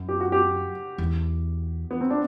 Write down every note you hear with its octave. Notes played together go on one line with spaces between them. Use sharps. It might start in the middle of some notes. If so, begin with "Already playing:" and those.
Already playing: F#2
G4
F#4
G4
E2
B3
C4
D4